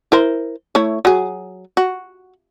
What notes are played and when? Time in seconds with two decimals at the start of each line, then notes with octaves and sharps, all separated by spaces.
0.12 E4 A#4 C5
0.75 A3 E4 C#5
1.05 F#3 G#4
1.77 F#4